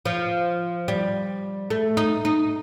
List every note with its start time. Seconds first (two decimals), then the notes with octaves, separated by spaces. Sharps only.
0.06 F3
0.88 G3
1.70 A3
1.97 D#4
2.25 D#4